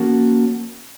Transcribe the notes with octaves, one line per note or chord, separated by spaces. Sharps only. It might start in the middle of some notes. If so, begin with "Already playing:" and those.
Already playing: F3 A#3 C#4 F#4 A4